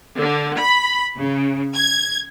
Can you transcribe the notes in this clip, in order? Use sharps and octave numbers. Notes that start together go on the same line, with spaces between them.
D3
B5
C#3
G#6